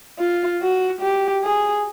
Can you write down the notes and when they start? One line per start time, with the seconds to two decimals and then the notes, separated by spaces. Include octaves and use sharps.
0.19 F4
0.61 F#4
1.01 G4
1.44 G#4